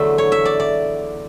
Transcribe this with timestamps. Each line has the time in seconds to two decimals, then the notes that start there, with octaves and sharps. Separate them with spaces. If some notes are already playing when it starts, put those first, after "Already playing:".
Already playing: E2 D3 F#3 A3 E5
0.18 C#5
0.32 E5
0.45 D5
0.60 D5